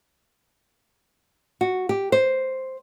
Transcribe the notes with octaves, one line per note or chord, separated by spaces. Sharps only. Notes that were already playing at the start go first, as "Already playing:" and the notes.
F#4
G4
C5